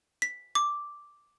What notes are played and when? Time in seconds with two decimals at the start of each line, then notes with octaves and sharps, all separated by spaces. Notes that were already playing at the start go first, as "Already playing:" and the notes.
0.22 B6
0.55 D6